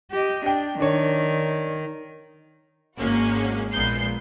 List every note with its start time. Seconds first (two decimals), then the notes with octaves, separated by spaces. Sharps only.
0.12 G4 D#5
0.46 D4 G5
0.80 D#3 D4 C#5
2.97 G#1 G#3 A#3 C#4 F#4
3.72 A#1 A#2 G#3 B3 G6 C7